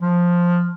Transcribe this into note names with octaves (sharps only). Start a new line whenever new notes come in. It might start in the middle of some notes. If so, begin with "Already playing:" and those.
F3